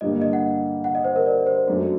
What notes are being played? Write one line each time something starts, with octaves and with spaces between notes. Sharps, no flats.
G2 D3 G3 A#3 D#5
D#5
F#5
F#5
D#5
C5
A#4
D5
C5
F#2 F#3 A3 D4 F#4
F#4